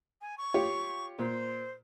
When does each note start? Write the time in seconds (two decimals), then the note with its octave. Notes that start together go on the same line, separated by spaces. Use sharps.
0.21 G#5
0.38 C#6
0.54 F4 G4 C#5
1.19 A#2 C5